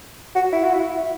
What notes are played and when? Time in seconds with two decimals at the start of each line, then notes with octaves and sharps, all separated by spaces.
0.35 F#4
0.53 E4
0.64 F#4
0.74 E4